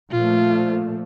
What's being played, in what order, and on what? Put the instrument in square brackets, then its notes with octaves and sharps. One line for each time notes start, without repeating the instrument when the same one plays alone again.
[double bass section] A#2 F3 A3 [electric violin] F4